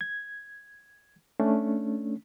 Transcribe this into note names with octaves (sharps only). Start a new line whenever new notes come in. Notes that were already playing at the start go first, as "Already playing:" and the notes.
G#6
A3 C#4 D4